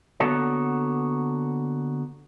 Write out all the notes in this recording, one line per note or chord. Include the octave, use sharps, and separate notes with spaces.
D3 A#3 B3 F#4 A4 C#5